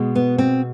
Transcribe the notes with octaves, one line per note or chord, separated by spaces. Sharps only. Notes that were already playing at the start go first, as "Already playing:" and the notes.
Already playing: B2 G#3
B3
C4